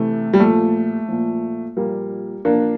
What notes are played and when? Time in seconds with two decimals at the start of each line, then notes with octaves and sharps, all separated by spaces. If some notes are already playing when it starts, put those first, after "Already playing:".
Already playing: C3 E3 A3
0.33 G3
0.40 A#2 F3 A3
1.08 A#2 F3
1.76 A#2 F3 G3 A#3
2.45 A#2 F3 A#3 D4